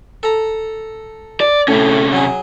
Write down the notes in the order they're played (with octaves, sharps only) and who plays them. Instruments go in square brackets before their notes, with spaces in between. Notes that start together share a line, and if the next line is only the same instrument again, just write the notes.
[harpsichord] A4 A#5
[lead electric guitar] D5
[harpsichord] A2 [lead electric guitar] C3 C#4
[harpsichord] F#3 G#4